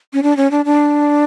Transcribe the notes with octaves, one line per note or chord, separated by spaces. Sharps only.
C#4
D4
C#4
D4
D4